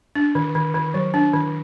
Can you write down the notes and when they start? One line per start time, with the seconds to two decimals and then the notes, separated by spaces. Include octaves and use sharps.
0.15 D4
0.35 D#3
0.55 D#3
0.75 D#3
0.94 F#3
1.14 D4
1.34 D#3